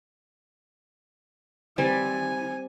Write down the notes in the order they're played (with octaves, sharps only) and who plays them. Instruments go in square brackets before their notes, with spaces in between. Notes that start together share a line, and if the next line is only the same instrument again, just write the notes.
[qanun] G3 C4 [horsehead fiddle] G#5